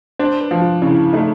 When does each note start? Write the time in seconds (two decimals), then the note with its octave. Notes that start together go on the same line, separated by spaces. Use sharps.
0.19 D4 C5
0.41 B4
0.51 F3
0.62 F4
0.82 C#3 E4
1.13 A3 D#4